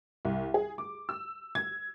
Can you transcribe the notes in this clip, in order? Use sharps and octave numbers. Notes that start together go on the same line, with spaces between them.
C2
G#4
D6
E6
G#6